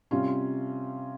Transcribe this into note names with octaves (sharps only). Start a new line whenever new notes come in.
C3 G3 C#4 F4